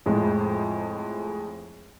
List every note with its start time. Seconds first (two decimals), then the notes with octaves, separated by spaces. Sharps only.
0.06 F2 A2 G#3